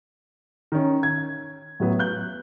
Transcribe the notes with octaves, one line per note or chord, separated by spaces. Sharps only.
D#3 C#4
G#6
A2 F#3 B3
F#6 G6